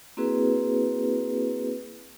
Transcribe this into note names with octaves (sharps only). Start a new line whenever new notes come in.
A#3 C4 E4 F#4 G#4 B4